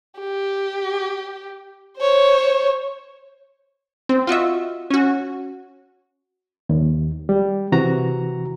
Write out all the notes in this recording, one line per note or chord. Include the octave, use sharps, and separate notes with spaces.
G4
C5 C#5
C4
F4 F#4 D#5 E5
C#4 F#4
D#2
G3
C3 E3 F#4 A#5